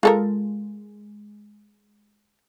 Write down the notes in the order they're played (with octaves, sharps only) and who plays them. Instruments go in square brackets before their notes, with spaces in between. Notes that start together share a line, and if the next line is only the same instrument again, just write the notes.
[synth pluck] G#3 [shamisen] F4 A4 A#4